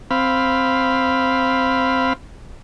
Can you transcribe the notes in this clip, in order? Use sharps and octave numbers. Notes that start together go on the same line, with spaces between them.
C4 F5 B5